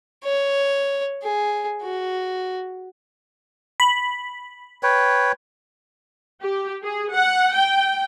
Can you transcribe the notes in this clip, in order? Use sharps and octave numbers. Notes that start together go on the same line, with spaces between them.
C#5
G#4
F#4
B5
B4 C#5 G5
G4
G#4
F#5
G5